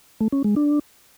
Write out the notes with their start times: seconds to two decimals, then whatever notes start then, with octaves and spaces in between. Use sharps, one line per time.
0.20 A3
0.32 C#4
0.44 G#3
0.56 D4